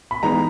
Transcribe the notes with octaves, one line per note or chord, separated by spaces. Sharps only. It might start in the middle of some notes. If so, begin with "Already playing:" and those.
B5
E3 G#3 B3 D#4 A#5